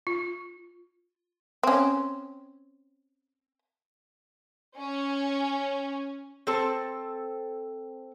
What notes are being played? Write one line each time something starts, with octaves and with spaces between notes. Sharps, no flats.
F4
C4 C#4
C#4
C4 A4 A5